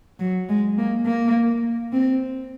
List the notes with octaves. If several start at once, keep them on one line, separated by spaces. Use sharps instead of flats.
F#3
G#3
A#3
A#3
C4